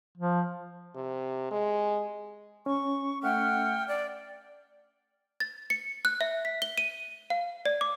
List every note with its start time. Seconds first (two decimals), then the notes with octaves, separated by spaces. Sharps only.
0.18 F3
0.95 C3
1.51 G#3
2.66 C#4 C#6
3.23 A3 F#5 G5 F6
3.88 D5
5.40 A6
5.70 C#7
6.05 F#6
6.21 E5
6.45 B6
6.62 G7
6.78 D#7
7.30 F5
7.66 D5
7.81 D6